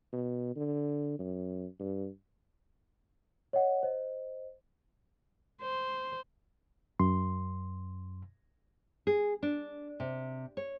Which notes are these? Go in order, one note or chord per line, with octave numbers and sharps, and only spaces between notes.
B2
D3
F#2
G2
C#5 D#5 F#5
C5 D#5
C5
F#2 C6
G#4
D4
C3
C#5